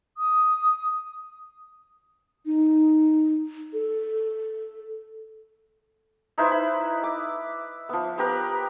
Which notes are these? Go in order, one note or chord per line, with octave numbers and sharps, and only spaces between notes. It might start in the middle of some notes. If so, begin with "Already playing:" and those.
D#6
D#4
A4
D#4 E4 B4 C5
B5
D6
F3 B3
B3 G4 A#4 B4